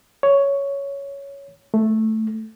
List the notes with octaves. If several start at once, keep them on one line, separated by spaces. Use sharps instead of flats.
C#5
A3